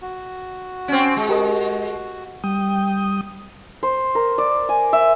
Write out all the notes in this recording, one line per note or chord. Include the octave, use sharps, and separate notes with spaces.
F#4
C4 C#4
G#3
G4 A#4 D#5
G3 G5 D#6
C5
A#4
D5
G#5
E5